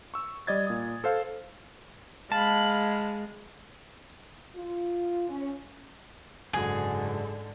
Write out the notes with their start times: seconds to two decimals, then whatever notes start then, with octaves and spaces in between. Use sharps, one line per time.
0.14 C#6 E6
0.47 G3 D5 D#5 G#6 A6
0.67 A#2 D#6
1.04 A4 C5 F5
2.32 G#3 F5 A5 B5
4.56 F4
5.30 C#4
6.53 F#1 G#2 D3 F#4 G#4